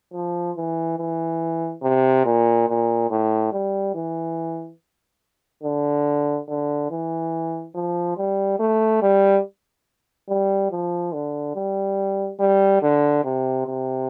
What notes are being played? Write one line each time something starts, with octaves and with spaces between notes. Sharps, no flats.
F3
E3
E3
C3
A#2
A#2
A2
G3
E3
D3
D3
E3
F3
G3
A3
G3
G3
F3
D3
G3
G3
D3
C3
C3